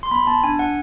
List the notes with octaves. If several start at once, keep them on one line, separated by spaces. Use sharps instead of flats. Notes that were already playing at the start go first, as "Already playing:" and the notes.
C6
B3 B5
B3 A5
D4 G#5
D4 F#5